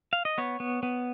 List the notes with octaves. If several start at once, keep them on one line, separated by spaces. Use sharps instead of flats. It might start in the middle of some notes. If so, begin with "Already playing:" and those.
F5
D#5
B3 C#5
B3
B3